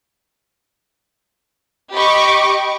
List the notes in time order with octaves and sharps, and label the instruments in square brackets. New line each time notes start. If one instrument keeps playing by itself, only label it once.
[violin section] G4 D#5 B5 C#6 D6